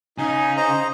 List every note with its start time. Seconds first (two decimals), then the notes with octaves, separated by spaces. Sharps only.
0.18 C#3 D#4 G#5
0.57 C5 D#5 A#5